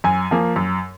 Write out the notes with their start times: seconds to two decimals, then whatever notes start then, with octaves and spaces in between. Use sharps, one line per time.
0.04 F#2 G#5
0.31 F3 A#3
0.56 F#2